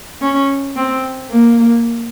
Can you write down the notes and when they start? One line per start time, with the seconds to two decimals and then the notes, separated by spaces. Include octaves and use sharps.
0.22 C#4
0.76 C4
1.30 A#3